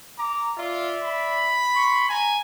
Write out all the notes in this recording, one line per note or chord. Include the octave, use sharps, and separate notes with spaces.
A#5 D6
F4 D5 E5
B5
C6 C#6
G#5 A#5